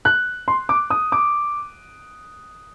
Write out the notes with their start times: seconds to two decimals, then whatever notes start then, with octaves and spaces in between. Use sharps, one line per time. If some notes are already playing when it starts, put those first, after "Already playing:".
0.05 F#6
0.48 C6
0.69 D6
0.90 D#6
1.12 D6